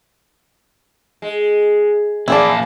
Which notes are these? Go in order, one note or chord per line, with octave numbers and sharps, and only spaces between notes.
G#3
F2 A#2 E3 A#3 E4 G#4 D5 A5